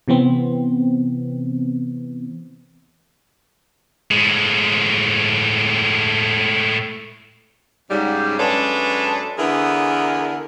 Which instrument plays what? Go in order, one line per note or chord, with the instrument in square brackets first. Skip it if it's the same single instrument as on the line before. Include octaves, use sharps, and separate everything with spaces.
[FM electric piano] C3 E3 B3 C4
[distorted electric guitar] A2 G#3
[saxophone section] G#2 C#3 G3
F#2 G#3 D4 A4 B4 C#5
D3 E3 B3 E4 G#4 A#4